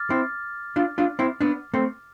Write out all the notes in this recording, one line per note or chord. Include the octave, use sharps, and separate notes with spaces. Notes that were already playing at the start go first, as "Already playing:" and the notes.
Already playing: D6 F6 A6
C4 E4
D4 F4
D4 F4
C4 E4
B3 D4
A3 C4